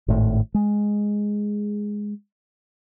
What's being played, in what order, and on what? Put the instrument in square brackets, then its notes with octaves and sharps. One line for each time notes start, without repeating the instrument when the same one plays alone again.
[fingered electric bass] G#1 A2
G#3